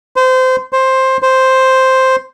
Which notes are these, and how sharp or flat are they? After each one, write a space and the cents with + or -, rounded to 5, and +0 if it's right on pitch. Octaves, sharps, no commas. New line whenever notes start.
C5 -25
C5 +10
C5 +0